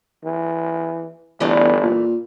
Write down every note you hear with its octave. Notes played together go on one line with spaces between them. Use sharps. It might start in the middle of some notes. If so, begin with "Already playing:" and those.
E3
G1 E2 E3 A3 D5
A#2